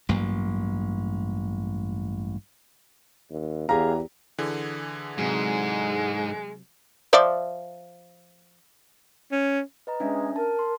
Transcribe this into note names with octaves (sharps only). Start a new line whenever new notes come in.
A1 G2 F#3 A#3
D#2
E2 G4 G#4 F5 A#5
D3 E3 G#4
G#2 C3 F#3 G#3
F3 D5 E5
C#4
B4 D#5 A#5
G#3 C#4 D4 E5
A#4 A5
C6